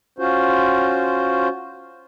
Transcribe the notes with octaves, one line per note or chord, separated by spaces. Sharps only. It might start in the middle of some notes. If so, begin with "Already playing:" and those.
C#4 F4 F#4 C5